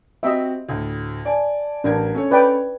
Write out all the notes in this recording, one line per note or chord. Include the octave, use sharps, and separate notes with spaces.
C4 F#4 G4 D#5 E5
D2 A2
D5 G#5 A5
A1 D4 A#4 G#6
C#4 A4 C#5
B4 D5 G5